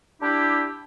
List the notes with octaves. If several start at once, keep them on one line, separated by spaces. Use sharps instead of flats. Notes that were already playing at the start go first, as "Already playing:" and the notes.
D4 E4 G4